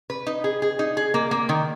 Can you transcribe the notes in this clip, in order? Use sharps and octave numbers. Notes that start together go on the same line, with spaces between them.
B4
D#4
G#4
G#4
D#4
G#4
A#3
A#3
D#3